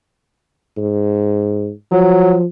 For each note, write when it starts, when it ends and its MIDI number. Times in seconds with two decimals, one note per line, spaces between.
0.77 1.71 44
1.91 2.44 53
1.91 2.37 54